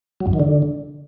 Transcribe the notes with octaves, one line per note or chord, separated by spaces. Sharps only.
F#3
F#2
D#3
D3